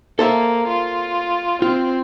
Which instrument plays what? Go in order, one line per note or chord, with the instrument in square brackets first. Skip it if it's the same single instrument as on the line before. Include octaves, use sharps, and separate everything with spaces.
[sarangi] A#3 [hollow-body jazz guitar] A4 C5 E5
[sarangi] F4
[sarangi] C4 [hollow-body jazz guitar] F4